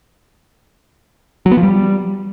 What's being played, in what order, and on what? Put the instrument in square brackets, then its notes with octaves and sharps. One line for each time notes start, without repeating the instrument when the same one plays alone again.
[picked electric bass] F#3
B3
F3
G3